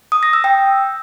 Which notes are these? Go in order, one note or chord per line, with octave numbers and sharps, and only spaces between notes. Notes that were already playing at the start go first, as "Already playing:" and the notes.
D#6
A#6
E6
G5